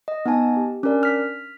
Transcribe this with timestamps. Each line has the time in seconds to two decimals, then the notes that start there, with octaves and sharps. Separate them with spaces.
0.08 D#5
0.26 B3 D#4 D#5 G#5 A5
0.57 G4
0.83 C#4 D4 A#4 D5
1.03 F6 B6